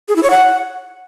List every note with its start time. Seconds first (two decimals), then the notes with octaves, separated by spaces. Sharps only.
0.08 G#4
0.16 E4
0.23 C#5
0.30 F#5